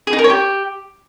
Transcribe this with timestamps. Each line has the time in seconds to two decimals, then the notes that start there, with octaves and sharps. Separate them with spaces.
0.07 G#4
0.13 D#4
0.19 A#4
0.24 C#5
0.30 G4